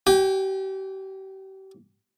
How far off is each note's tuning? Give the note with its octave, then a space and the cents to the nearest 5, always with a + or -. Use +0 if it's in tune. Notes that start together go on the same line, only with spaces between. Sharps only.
G4 -35 G5 +35